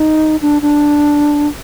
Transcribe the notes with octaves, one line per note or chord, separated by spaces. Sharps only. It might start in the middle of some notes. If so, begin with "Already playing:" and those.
Already playing: D#4
D4
D4